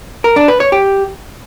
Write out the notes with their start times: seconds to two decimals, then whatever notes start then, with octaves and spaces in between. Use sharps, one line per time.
0.24 A#4
0.36 D4
0.48 B4
0.60 C#5
0.72 G4